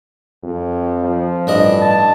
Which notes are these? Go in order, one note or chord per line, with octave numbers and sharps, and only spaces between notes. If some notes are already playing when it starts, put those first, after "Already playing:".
F2
F3
A1 G2 D4 D#5
A5